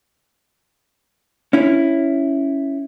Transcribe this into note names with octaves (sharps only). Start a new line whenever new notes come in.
C#4 E4